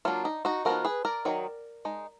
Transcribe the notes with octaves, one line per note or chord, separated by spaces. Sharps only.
F#3 A#3 D4 F4
D#4
D#4 F#4
F3 B3 D#4 F#4 A#4
G#4 B4
A#4 D5
D#3 F#3 B3 D#4
G#3 D#4